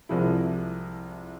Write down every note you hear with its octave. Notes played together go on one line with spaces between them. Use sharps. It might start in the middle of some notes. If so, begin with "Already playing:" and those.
C2 C3 F3 G#3 E4